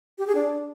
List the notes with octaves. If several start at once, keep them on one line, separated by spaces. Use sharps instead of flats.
G4
G#4
D4